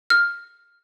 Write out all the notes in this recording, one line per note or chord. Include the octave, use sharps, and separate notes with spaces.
F6